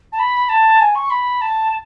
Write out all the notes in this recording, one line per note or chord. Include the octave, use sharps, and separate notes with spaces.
A5
B5
A5
G#5
C#6
B5
A5